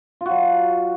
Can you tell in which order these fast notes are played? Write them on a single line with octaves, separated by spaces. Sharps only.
F4 F#4 F#3